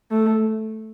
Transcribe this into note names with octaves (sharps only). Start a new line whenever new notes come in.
A3